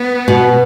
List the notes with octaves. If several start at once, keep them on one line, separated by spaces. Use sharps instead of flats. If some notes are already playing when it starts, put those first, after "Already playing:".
Already playing: B3
B2